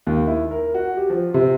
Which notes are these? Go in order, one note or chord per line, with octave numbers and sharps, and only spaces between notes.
D#2
E4
A#4
F#4
G4
F3
C3